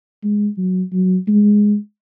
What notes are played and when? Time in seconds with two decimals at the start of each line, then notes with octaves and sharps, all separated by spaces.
0.24 G#3
0.58 F#3
0.93 F#3
1.27 G#3